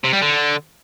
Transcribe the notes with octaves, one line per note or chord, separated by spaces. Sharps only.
C3
G3
D3